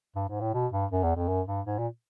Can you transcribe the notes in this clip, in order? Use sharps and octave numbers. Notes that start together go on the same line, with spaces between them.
G2
G#2
A2
B2
G2
F#2
E2
F2
F#2
G2
G#2
A#2